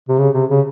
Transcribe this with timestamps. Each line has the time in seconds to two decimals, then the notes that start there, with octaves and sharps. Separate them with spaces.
0.09 C3
0.18 C#3
0.34 C3
0.50 C#3